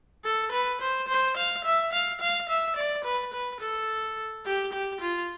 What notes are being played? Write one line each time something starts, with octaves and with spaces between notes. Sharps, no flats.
A4
B4
C5
C5
F5
E5
F5
F5
E5
D5
B4
B4
A4
G4
G4
F4